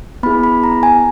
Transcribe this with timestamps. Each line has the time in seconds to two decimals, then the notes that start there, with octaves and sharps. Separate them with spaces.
0.23 B3 E4 G#4 B5
0.44 B5
0.64 A#5
0.83 G#5